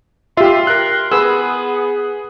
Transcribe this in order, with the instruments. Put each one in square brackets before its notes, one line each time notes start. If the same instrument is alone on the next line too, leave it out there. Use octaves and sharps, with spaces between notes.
[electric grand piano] F4 [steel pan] G4 E5 [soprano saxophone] C6
[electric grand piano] A#4 F#6
[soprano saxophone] B3 [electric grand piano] G#4 [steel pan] B4 E6